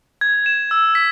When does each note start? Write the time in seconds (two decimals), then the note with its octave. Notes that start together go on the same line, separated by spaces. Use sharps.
0.21 G#6
0.46 E7
0.71 E6
0.95 B6